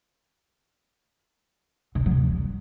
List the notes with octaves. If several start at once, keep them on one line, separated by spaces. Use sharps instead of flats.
D3
C#3
F#3
C3
G3